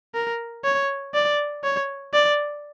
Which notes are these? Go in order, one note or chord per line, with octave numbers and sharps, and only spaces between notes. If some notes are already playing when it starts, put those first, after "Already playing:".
A#4
C#5
D5
C#5
D5